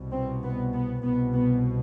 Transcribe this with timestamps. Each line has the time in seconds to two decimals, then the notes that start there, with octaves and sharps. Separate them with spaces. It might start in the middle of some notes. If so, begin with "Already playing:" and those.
Already playing: C2 B2
0.12 C4
0.43 B3
0.73 B3
1.03 C2 B2 B3
1.33 B3